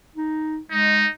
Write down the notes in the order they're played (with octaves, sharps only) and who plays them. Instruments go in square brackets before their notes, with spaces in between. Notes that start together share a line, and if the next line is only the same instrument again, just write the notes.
[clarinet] D#4
[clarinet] G#3 [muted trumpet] D#4